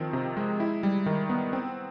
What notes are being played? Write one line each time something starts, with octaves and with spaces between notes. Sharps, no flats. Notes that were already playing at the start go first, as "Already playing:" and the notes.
Already playing: D#3 F3 C4
C3
G#3
E4
G3
D#3
B3
C4